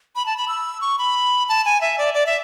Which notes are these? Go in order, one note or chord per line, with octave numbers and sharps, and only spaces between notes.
B5
A5
B5
E6
C#6
B5
A5
G#5
E5
D5
D5
E5